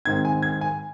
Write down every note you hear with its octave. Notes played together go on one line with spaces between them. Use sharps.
G#2 D#3 C4 D#4 G#6
G#5
G#6
G#5